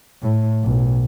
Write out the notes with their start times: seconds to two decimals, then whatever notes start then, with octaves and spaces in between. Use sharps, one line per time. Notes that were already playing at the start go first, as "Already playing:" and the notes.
0.22 A2
0.64 B1